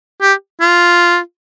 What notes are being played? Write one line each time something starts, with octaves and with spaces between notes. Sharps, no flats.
G4
F4